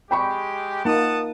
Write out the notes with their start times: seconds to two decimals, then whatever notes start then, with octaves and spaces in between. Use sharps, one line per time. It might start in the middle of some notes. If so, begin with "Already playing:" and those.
0.11 G#3 G4 G5 B5 C#6
0.85 A#3 D#4 F#5 A5 D#6